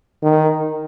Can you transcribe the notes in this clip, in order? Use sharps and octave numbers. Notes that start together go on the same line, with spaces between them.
D#3